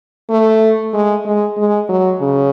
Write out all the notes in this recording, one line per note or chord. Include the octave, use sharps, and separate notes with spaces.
A3
G#3
G#3
G#3
F#3
C#3